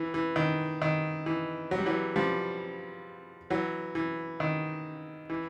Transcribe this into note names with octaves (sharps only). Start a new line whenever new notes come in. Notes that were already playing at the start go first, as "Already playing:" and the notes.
Already playing: E3
E3
D#3
D#3
E3
F#3
G3
E3 F#3
F3 G3
E3 F#3
E3
D#3
E3